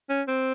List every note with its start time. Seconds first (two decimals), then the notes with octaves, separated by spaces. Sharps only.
0.09 C#4
0.28 C4